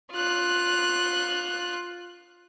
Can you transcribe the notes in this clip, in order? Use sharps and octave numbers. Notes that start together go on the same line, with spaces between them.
F4 F#6